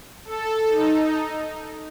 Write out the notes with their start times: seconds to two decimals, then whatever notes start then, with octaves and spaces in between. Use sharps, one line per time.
0.25 A4
0.68 D#4